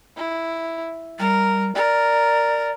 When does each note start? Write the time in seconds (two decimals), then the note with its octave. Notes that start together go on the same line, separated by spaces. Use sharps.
0.16 E4
1.19 G3 A#4
1.75 A#4 D5